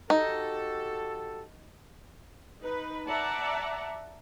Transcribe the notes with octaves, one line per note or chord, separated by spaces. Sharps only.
D#4 F#4 G4 A4
D#4 B4
D5 E5 F#5 A5 A#5